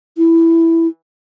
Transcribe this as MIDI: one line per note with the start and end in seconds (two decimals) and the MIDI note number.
0.18 0.87 64